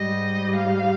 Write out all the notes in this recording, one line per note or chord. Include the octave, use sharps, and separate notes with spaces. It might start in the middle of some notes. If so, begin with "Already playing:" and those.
Already playing: G#2 G3 D#5
F5